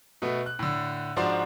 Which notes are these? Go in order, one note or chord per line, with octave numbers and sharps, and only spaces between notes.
B2 A3 B3
F#6
A2 D3
G#2 F3 D4 F#4 D5 C6